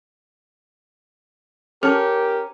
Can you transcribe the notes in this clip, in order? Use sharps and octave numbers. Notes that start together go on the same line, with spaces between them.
C#4 G4 A4 A#4 A5